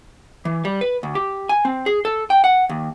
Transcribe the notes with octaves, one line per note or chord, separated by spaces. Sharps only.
E3
G3
B4
D2
G4
G#5
C4
G#4
A4
G5
F#5
D#2